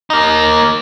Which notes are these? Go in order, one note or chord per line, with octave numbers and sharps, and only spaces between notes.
A#3 D#4